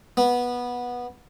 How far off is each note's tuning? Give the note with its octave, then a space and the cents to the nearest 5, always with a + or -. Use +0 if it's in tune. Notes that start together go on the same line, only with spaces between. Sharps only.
B3 -15